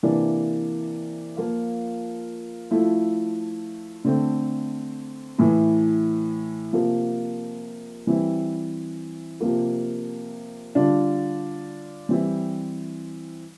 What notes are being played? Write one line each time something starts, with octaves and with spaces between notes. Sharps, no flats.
C3 E3 A#3 D4
F3 A#3 F4
F3 A3 E4
D3 A3 C4
A2 E3 A3
C3 F3 A#3
E3 G3 C4 E4
C3 F3 A#3
D3 G3 D4 F4
E3 G3 C4 E4